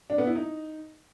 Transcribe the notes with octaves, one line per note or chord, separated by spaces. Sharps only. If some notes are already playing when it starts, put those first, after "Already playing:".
D4
B3
E4
D#4